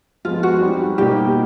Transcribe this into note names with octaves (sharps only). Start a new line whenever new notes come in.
F3 G#3 B3 F4
F#4
G3 C4 D#4
B2 G3 A#3 D#4 F#4 G4